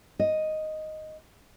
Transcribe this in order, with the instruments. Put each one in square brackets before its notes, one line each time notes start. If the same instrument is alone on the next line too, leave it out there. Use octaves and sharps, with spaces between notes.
[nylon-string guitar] D#5